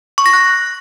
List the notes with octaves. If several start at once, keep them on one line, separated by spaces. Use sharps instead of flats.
C#6
A#6
F#6